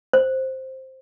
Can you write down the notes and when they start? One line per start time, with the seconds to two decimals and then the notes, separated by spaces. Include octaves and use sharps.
0.13 C5